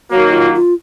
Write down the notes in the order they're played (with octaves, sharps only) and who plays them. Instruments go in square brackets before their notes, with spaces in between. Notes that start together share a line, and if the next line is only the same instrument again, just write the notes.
[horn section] D#3 F#3 A#3 [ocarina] F#4
[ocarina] F4
F4